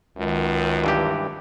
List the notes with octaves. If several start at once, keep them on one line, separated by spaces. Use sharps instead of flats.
C#2 F#2 D#3
G2 E3 G4